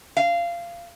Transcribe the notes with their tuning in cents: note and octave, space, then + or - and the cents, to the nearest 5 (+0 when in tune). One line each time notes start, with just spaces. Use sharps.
F5 -20